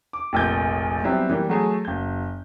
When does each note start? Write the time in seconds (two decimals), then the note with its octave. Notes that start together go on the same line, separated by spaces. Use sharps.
0.13 D6
0.33 F1 A#1 A#2 G6
1.03 F#3 G3 B3 C4 E4
1.30 E3 G3 A#3
1.49 F#3 A3 G#4
1.85 F#1 G6